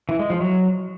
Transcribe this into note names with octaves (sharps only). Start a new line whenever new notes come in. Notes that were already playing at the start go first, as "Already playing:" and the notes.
E3
G#3
F3
F#3